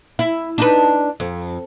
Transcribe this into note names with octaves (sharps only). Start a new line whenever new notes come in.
E4
D4 D#4 B4
F2